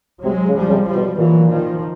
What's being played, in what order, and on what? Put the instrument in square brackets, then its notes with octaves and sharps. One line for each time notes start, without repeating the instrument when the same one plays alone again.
[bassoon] C3 [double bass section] F#3 G#3
[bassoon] C#3
[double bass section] F3 G3
[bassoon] C#3
C3
[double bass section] F3 G3
[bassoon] B2
[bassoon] A#2 [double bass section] E3 F#3
[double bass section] D#3 F3